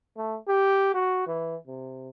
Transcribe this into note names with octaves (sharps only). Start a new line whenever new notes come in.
A3
G4
F#4
E3
C3